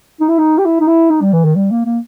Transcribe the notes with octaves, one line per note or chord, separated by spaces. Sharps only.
D#4
E4
D#4
G4
E4
D#4
E4
D#4
G3
E3
D#3
G3
A#3
A#3